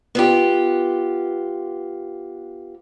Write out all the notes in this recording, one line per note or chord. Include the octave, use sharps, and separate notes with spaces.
B3 F4 G4